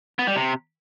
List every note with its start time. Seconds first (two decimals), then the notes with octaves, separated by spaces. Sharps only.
0.19 B3
0.27 G3
0.36 C3